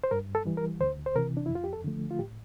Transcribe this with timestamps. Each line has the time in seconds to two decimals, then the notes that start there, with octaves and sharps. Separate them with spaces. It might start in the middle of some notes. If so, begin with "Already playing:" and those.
0.04 C5
0.11 G2 A#4
0.35 A4
0.45 E3 G3
0.57 A#4
0.80 D2 C5
1.06 C5
1.16 C3 E3 A#4
1.37 D4
1.46 F2 E4
1.55 F4
1.64 G4
1.73 A4
1.84 D3 F3 A3
2.11 F4
2.19 A2 G4